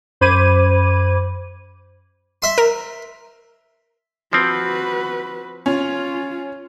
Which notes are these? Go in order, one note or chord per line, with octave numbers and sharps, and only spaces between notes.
F#2 C5 B5 D6 G#6 D#7
E5 C6
A#4
F3 C4 F#4 B4
C#4 F4